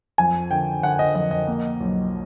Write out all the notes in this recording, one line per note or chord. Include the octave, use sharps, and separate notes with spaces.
F2 G#5
D3 G5
D3 F#5
D#5
F2 D#5
D#5
A#3
B1